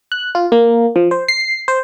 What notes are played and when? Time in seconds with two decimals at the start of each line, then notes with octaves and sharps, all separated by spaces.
0.12 F#6
0.35 F4
0.52 A#3
0.96 F3
1.11 C5
1.28 C7
1.68 C5